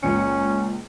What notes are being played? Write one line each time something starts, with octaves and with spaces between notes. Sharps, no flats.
C#2 A#2 C#4 C#7